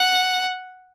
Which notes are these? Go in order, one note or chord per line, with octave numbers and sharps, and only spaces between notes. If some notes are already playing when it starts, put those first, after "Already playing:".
Already playing: F#5